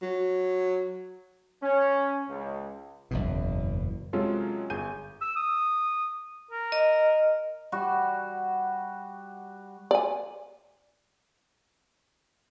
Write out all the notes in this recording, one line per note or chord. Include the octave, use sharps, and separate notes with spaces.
F#3
C#4
C#2
F#1 E2 B2
C3 F#3 G#3 C#4 F4 A4
G1 G#4 G#5 G6 D#7
E6
D#6
A#4
D#5
G3 F#4
D5 G#5